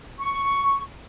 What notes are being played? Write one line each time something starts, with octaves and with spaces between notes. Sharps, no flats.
C#6